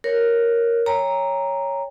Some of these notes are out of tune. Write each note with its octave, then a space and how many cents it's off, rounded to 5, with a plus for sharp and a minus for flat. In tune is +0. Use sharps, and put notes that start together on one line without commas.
A#4 +0 C#5 +0
C#5 +0 G5 +35 A#5 +0